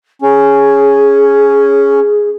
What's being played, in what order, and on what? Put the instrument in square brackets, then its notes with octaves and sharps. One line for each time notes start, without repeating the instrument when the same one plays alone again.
[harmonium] C#4 [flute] G#4